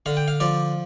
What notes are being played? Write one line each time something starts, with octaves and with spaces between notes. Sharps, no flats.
D3 F5
G5
F5
F3 D5